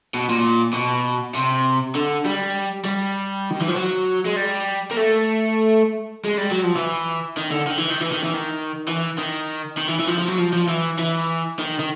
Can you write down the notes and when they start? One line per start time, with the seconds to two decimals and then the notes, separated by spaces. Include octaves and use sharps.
0.14 B2
0.30 A#2
0.74 B2
1.35 C3
1.95 D3
2.25 G3
2.85 G3
3.50 D#3
3.60 E3
3.68 F3
3.76 F#3
4.26 G#3
4.36 G3
4.91 A#3
4.96 A3
6.25 G#3
6.38 G3
6.51 F#3
6.64 F3
6.76 E3
7.37 D#3
7.51 D3
7.67 D#3
7.78 E3
7.90 D#3
8.01 E3
8.12 D#3
8.24 E3
8.34 D#3
8.88 E3
9.18 D#3
9.77 D#3
9.88 E3
10.00 E3
10.08 F3
10.18 F3
10.28 F#3
10.38 F3
10.53 F3
10.68 E3
10.98 E3
11.59 D#3
11.79 D#3